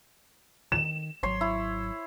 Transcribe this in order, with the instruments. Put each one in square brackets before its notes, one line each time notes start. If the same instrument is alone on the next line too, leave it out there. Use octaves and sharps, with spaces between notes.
[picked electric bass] D#3 [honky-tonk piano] E7
[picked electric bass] G#1 F#3 [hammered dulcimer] C#5 C6
[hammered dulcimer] E4